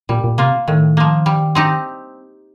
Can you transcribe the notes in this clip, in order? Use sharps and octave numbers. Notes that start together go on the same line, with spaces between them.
A#2 G3
A#2
C3 A#3 F4
A2 D#3
F3 A#3
G3
C4 D#4 G4